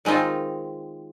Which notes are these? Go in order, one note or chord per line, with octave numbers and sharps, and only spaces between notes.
D#3 G#3 C4 D#4 F4